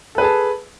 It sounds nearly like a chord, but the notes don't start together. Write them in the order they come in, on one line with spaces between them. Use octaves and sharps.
A4 B4 G#4 A5